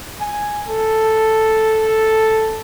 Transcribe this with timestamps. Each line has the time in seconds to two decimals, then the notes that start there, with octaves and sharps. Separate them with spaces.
0.21 G#5
0.68 A4